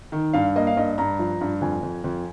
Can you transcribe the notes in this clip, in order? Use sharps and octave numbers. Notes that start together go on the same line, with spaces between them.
D#3
G2 F5
A#3 D#5
F5
G2 D#5
G2 A#5
F3
G2
F2 G#5
F2
F2